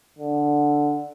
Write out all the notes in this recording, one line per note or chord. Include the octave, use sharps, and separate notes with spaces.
D3